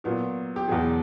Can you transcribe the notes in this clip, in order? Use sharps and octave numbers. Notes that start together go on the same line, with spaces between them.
A#2 F#3 B3 F#4
G4
E2 B2 F#3 G#4